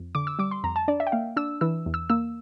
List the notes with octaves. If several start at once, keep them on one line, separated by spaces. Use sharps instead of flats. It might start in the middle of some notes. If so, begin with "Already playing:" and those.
Already playing: F2
D3 D6
E6
G3 D6
C6
F2 A#5
A5
D4 D5
E5
G5
A#3 F5
D4 E6
E3 E6
E2
E6
A#3 E6